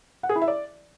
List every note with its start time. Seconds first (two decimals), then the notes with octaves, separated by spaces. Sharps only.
0.23 F#5
0.29 G#4
0.35 E4
0.42 E5
0.48 D5